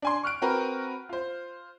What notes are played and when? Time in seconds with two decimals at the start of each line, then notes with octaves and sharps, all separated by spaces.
0.02 D4 G#5 C6
0.23 C#6 F6 F#6 D7
0.42 C4 F#4 A#4 B4
1.09 F4 C5